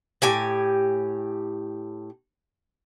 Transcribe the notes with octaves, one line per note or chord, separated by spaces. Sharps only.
A2 G4 G#5